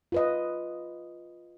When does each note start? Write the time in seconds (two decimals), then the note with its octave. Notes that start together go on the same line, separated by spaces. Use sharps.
0.12 F4 B4 D#5